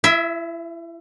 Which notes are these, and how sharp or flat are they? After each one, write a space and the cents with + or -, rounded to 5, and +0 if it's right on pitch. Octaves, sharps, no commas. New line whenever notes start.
E4 +30 E5 -15